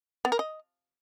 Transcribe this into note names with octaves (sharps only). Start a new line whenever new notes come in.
B3
A#4
D#5